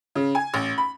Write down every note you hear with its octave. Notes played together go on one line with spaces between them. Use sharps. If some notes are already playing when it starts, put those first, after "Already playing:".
C#3
G#5
A1
B5